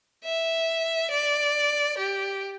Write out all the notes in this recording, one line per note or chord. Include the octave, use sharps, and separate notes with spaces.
E5
D5
G4